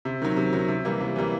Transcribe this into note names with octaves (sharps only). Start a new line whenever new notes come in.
C3
D#3 F#3
C3
D#3 F#3
C3
E3 G3 A#3
C3
E3 G3 A#3